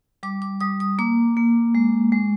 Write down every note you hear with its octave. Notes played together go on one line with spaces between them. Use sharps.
G3 D6
D6
G3 D#6
D#6
A#3 D6
A#3
G#3
G#3